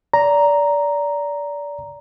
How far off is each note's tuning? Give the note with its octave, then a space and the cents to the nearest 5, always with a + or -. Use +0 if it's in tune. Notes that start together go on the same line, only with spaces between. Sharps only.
D5 -20 A#5 +0